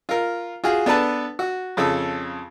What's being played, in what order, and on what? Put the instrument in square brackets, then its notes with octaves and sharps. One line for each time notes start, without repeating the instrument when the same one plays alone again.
[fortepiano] F4 A#4
F4 F#4 G#4
B3 D4 A4 B4 A5
F#4
F2 C#3 A4